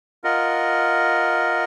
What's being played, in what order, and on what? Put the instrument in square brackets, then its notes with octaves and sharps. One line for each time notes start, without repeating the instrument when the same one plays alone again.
[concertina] F4 A#4 D#5 F#5